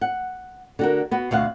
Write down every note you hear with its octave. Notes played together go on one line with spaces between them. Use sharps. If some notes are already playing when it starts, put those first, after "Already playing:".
F#5
D3 F#4 A#4
B3 F#4
D2 B2 F5 F#5